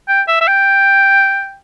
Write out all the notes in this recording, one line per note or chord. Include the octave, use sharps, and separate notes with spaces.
G5
E5
E5
G5